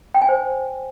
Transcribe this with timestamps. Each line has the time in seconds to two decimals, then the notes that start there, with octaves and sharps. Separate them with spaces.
0.14 G5
0.22 G#5
0.29 C5